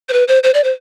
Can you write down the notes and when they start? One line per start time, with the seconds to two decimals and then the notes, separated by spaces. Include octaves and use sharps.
0.09 C5
0.13 B4
0.28 C5
0.44 C5
0.54 D5
0.64 C5